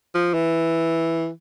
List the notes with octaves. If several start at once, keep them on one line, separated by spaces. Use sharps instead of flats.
F3
E3